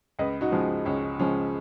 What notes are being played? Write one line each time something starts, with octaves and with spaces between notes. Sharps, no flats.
C#2 B4 D#5
D#4 F#4
C#3 F3 G#3
C#2 C#4
C#3 F3 G#3 C#4